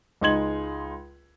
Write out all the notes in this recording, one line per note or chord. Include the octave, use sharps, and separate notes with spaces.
C#2 G#3 D#4 C6 G#6 F#7